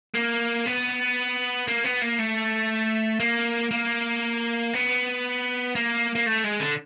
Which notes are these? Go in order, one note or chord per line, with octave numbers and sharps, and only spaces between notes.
A#3
B3
A#3
B3
A#3
A3
A#3
A#3
B3
A#3
A#3
A3
G#3
D3